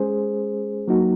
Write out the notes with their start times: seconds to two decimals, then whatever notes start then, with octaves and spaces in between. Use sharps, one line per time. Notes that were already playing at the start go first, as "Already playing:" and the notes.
Already playing: G#3 C#4 G#4 C5
0.88 F#3 A#3 D#4 F#4